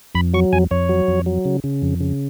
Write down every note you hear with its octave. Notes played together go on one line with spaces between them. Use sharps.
F2 B5
F#3 C#6
F2 G#5
F2 C#5
F#3
F2
F#3
C#3
C#3
F2
C#3